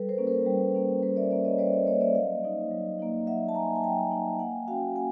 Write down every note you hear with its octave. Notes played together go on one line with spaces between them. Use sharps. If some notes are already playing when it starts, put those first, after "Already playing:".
Already playing: G3 A4 B4
A#4 C5
A#3 C#4
A#4 C5
G3
A#3 C#4
G3 A#4 C5
D5 E5
A#3 C#4 D5 E5
C#5 D#5
G3 C5 D5
C#5 D#5
A#3 C#4 C#5 D#5
D5 E5
F#3 D#5 F5
A#3 D#4
F#3
A#3 D#4
F#3 E5 F#5
A5
A#3 D#4 G#5 A#5
G#5
F#3 G5 A5
A#3 D#4
A#3 F#5 G#5
C#4 F#4 F5 G5
A#3 F#5 G#5